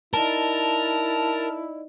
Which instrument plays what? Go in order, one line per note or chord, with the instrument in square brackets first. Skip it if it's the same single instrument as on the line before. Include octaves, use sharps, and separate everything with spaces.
[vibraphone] D#4 D5 D#5 [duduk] E4 [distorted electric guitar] A#4 [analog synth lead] A5